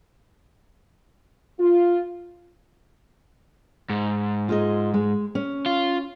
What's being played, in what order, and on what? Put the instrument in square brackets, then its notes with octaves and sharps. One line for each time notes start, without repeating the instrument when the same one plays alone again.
[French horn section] F4
[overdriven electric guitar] G#2
[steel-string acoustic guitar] F4 G#4 D#5
G#3
C#4
[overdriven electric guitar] F4